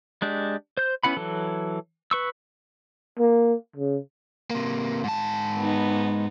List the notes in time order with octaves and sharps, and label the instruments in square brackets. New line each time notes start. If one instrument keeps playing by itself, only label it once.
[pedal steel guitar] G#3 D4 G4
C5 G6
B3 C#4 E4 F#5 B5
E3 F#3 A4
B4 C#6 E6
[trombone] A#3
C#3
[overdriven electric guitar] C3 A#3
G#2 A5
[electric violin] B3 D#4